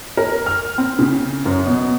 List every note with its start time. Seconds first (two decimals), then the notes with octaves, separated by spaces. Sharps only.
0.17 A#4
0.46 F6
0.78 C4
0.99 C#3
1.46 F#2
1.66 B2